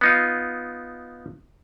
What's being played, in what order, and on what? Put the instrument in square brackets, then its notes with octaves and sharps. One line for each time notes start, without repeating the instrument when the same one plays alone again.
[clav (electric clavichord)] B3 D#4 F4